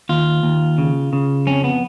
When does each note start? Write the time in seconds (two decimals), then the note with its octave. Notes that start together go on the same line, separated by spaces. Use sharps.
0.09 D#2 F4
0.43 D#2
0.78 C#3
1.13 C#3
1.47 F2 C#4
1.64 B3